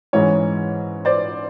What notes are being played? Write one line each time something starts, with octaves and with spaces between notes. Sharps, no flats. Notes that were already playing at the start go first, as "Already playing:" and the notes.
G#2 E3 G#3 C#4 C#5
C5 D5